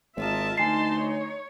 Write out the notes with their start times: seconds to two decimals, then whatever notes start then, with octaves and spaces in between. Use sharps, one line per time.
0.16 G#1 F4 A#4 D#5 E5 A5
0.58 D2 D#4 G#5 A5 C6 C7
1.00 C#5